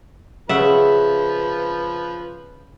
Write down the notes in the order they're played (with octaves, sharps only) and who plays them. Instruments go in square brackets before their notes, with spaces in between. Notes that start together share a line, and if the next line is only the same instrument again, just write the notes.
[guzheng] C#3 [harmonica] F3 B4 [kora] E5 F#5